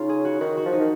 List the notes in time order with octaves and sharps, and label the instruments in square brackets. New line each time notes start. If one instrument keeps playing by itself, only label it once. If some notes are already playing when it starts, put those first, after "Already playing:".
Already playing: [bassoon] C#3 [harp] D#4 F4
[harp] G#4
F#4
[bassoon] D#3 [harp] F#4
[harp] F#4
[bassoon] F3
[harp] D#4
[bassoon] D#3